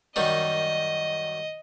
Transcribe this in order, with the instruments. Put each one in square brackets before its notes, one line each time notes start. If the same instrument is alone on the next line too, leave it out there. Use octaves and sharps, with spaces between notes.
[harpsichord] F#2 D#3 G3 [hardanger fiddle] D#5